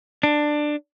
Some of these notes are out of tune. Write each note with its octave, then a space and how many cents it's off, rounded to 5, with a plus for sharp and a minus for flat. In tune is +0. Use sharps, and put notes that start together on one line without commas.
D4 +15